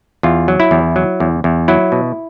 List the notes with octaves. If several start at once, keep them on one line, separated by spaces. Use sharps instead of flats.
E2 F4
F#3
E4
E2
F#3
E2
E2
F#3 E4
B2